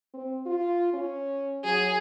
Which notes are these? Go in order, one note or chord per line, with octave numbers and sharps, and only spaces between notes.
C4
F4
C#4
F#3 G#4